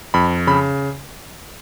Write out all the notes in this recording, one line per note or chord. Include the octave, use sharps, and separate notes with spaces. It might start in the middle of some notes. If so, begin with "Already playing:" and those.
F2 B5
C#3 B5